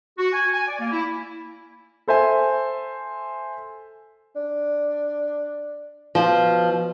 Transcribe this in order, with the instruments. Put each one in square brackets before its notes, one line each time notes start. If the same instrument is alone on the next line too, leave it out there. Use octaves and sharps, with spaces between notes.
[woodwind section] F#4
G#5
G#5
D5
A#3
E4
[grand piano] A4 C5 E5 G#5
[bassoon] D4
[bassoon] B2 [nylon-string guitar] F3